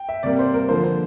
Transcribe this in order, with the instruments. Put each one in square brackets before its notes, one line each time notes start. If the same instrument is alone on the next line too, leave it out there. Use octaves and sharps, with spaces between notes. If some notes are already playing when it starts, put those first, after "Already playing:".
Already playing: [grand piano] G5
E5
C3 G3 A#3 D5
C5
A#4
D3 F3 A#3 C5
C5